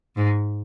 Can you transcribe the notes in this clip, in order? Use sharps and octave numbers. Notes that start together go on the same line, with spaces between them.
G#2